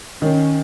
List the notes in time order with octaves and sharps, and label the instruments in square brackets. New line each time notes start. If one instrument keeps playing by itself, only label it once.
[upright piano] D#3 [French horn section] C#4